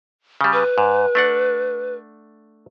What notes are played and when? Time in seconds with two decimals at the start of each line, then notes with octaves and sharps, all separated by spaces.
0.41 C#3 G3
0.53 B4
0.78 G#2
1.15 A3 D4 F#5